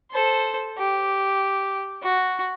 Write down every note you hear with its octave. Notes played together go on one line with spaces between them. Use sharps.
A4 C5
G4
F#4